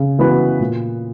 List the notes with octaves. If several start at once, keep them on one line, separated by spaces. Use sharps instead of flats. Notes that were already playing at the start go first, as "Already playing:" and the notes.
Already playing: C#3
E3 B3 F#4 B4
A#2